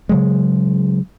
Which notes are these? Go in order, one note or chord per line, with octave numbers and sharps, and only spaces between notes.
C#3 F#3 G#3